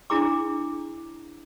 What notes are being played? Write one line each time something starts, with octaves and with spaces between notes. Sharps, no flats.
D4 E4 G#4 A#5 D6